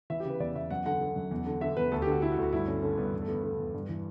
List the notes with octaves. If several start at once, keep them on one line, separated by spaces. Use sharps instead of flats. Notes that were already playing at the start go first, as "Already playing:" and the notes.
E3 E5
C#3 G4
B4
E2 D5
E2 E5
F#2 F#5
D3 F#5
D3
F#2
E2
D3
D3 E5
E2 B4
D2 A4
G4
D3 F#4
D3 E4
F#4
D2
F#4
G2 E4
D3 C#4
D3 C#4
G2 B3
E2
A3
D3 B3
D3
E2
G2
E3